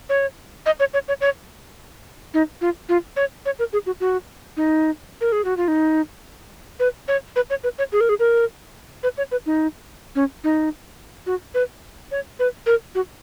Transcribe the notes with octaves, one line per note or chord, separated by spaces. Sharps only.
C#5
D#5
C#5
C#5
C#5
C#5
D#4
F4
F4
C#5
C#5
A#4
G#4
F#4
F#4
D#4
A#4
G#4
F#4
F4
D#4
B4
C#5
B4
C#5
B4
C#5
G#4
A#4
G#4
A#4
B4
C#5
B4
D#4
C#4
D#4
F#4
B4
C#5
B4
A#4
F#4